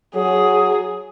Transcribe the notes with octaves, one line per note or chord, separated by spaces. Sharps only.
F#3 G#4